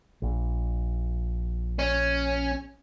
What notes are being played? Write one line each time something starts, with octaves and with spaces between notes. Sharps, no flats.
A#1
C#4